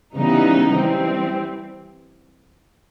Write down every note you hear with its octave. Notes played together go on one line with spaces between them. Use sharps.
C#3 E3 G3 B3 D#4
E3 G3 C4